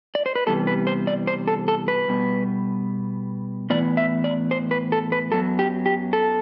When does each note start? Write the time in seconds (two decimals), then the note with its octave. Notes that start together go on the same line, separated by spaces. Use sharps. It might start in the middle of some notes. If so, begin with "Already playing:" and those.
0.15 D5
0.26 C5
0.35 B4
0.47 C3 E3 G3 B3 A4
0.67 B4
0.87 C5
1.07 D5
1.27 C5
1.48 A4
1.68 A4
1.88 B4
2.08 B2 G3 B3
3.70 A2 E3 B3 D5
3.97 E5
4.24 D5
4.51 C5
4.71 B4
4.92 A4
5.12 B4
5.32 F#2 F#3 B3 A4
5.59 G4
5.86 G4
6.13 A4